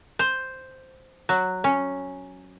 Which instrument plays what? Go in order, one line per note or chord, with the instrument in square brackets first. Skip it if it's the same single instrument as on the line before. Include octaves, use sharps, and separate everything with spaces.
[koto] C5
F#3
C#4